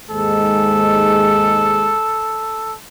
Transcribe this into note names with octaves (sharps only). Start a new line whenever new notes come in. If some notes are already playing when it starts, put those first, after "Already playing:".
D#2 G#2 G#3 A4